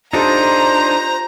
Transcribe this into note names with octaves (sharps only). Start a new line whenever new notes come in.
D4 D#4 F4 G4 A4 C5 A#5